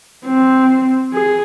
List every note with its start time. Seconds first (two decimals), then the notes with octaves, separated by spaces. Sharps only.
0.26 C4
1.13 G#4